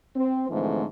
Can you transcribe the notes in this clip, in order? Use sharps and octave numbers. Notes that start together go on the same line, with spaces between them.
C4
G#2 D3 E3 F3 A3 C4